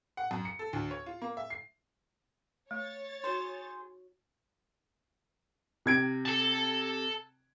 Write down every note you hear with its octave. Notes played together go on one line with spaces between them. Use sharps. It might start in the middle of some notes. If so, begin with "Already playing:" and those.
F#5
F#2
C#7
A4
D2
C#5
F4
A#3
E5
C7
A3 C#5 A6
D#4 F#4 G#4 C5
C3 G#6 D7
A4 A5